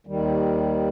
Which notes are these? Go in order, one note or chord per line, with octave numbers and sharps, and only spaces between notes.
D#2 D#3 G3